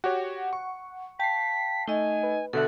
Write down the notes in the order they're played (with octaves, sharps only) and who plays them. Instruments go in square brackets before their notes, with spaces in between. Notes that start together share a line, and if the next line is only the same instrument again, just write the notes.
[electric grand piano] F#4 G4 C#5 [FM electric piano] F#5
[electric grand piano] C#6
[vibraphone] F5 A5 [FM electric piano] G5 C7 [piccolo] B6
[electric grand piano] A3 [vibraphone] D#4 D#5 [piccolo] G#5
[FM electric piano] B4
[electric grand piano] B2 D3 E5 [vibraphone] A4 [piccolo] F#5